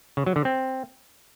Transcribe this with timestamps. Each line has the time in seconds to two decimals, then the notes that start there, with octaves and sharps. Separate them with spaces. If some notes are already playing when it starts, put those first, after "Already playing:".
0.17 C#3
0.26 F#3
0.36 D3
0.45 C4